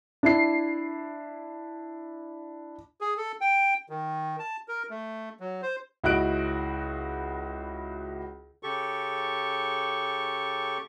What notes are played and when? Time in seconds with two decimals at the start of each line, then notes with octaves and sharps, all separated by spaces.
0.23 D4 E4 C7
3.01 G#4
3.17 A4
3.41 G5
3.89 D#3
4.39 A5
4.68 A#4
4.90 A3
5.40 F#3
5.62 C5
6.04 C#2 E4 F#4 D#5 F#6 D7
8.63 C#3 G4 A4 C#6